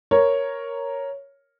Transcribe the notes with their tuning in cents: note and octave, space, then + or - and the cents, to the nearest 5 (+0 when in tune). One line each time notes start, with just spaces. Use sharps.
A#4 +0 C#5 +0